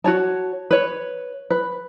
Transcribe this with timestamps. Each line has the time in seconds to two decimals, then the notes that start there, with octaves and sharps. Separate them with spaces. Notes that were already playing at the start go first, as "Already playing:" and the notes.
0.04 F#4 G#4 C#5 A5
0.71 B4 C#5
1.50 B4